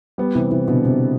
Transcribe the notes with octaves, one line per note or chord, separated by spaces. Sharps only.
G3 B3
C3 E3
C3 E3
B2 D3
C3